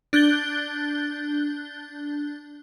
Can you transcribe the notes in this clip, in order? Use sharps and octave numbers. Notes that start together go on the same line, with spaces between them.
D4 F#6 G6 A6 G7